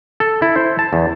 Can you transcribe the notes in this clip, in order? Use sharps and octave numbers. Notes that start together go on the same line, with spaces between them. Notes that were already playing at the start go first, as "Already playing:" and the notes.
A4
E4
C5
A5
E2